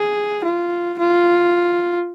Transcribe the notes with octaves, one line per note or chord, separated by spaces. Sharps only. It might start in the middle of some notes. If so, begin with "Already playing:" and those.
Already playing: G#4
F4
F4